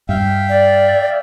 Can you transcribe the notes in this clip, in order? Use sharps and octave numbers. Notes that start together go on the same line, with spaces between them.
G2 E5 F5 G5
D5